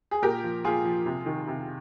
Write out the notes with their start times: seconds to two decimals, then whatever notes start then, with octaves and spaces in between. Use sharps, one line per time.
0.11 G#4
0.22 A#2 G4 A#4
0.44 F3
0.65 A#2 F4 G#4
0.85 F3
1.06 C3
1.26 D#3
1.48 C3